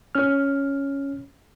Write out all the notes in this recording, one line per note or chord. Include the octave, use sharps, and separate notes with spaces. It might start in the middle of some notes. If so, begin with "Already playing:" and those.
C#4 F6